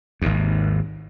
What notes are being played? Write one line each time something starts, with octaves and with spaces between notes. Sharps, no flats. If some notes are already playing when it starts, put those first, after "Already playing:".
G#1 D#2